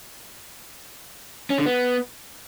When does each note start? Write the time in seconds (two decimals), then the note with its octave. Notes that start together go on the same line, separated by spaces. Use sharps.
1.50 C#4
1.58 D3
1.66 B3